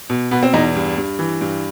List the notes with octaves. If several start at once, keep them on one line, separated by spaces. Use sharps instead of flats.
B2
B2 B3
C4
E2 D#4
G2
G2
E3
G2